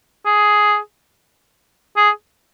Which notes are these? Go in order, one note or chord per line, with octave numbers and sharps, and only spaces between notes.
G#4
G#4